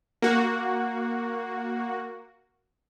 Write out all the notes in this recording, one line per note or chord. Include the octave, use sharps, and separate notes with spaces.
A#3 F#4